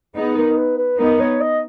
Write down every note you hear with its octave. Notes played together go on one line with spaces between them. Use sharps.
B3 D#4 G#4
A#4
B4
B4
B3 D#4 A#4
C#5
D#5